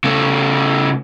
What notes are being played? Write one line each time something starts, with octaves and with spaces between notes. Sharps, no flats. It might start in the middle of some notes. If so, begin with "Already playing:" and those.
C#3 A3